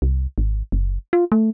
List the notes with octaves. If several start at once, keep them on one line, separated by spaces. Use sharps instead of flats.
C2
G#1
F#1
F4
A3